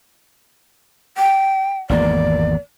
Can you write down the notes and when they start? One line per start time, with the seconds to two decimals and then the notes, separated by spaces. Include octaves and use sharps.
1.18 G5
1.90 G#1 E2 A#3 D5